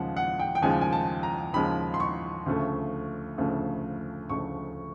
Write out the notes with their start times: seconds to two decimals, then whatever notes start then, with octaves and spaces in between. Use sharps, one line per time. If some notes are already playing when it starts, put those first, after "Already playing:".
Already playing: D#2 C#3 F3 G#3 F#5
0.17 F#5
0.40 G5
0.55 G5
0.62 D#2 C#3 F3 G#3 G#5
0.81 G#5
0.93 A5
1.23 A#5
1.54 D#2 C#3 F3 G#3 B5
1.94 C6
2.00 C#6
2.46 D2 C#3 F3 A3
3.38 D2 C#3 F3 A3
4.30 D2 C#3 F3 A3 C#6